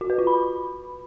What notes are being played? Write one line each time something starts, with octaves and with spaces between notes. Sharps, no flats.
F#4
B4
F4
B5